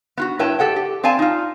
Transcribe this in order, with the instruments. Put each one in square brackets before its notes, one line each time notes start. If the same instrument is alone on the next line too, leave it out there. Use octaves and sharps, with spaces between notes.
[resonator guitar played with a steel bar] B3 F4 F#4
G2 E4 B4 C#5 G5 A5
G4 A4 F#5 G5
G4
C4 D5 F5 G#5 A5
D#4 F4